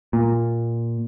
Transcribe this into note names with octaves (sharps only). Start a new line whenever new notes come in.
A#2